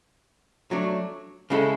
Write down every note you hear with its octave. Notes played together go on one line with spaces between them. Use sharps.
F#3 A3 D4
C#3 G#3 C#4 E4 A4